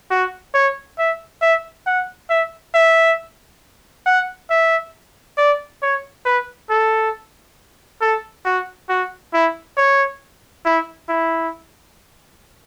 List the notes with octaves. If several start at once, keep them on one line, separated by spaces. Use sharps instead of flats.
F#4
C#5
E5
E5
F#5
E5
E5
F#5
E5
D5
C#5
B4
A4
A4
F#4
F#4
E4
C#5
E4
E4